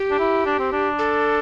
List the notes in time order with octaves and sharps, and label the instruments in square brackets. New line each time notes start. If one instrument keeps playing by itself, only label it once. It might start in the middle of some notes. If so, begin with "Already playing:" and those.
Already playing: [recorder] G4
[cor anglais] D4
E4
D4
C4
D4
[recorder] A4